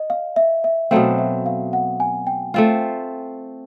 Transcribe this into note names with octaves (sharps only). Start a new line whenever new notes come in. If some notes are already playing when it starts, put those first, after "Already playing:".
Already playing: D#5
F5
E5
E5
B2 F#3 A3 C4 F5
E5
F5
F#5
G#5
G5
A3 C4 F4